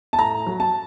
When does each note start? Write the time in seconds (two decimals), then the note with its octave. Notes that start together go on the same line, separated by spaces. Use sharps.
0.13 A5
0.19 A2 A#5
0.46 F#3
0.60 A5